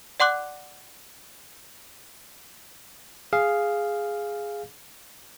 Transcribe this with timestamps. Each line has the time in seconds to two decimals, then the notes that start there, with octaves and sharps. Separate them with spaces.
0.20 D5 F#5 C6 D6 F#6
3.33 G#4 F5